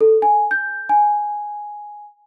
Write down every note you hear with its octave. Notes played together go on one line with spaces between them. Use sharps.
A4
G#5
G6
G#5